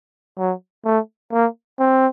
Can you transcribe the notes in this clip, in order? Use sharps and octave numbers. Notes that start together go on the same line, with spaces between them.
F#3
A3
A#3
C4